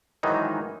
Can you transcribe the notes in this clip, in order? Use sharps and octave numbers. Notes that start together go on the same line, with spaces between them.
G#2 D#3 E3 F#3 D#4